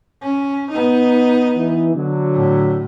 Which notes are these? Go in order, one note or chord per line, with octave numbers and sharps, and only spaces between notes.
C#4
B3 D#4
E3
D3 F#3
A2